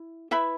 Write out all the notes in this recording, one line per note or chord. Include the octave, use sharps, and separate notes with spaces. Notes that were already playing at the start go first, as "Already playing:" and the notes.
Already playing: E4
E4 B4 E5 B5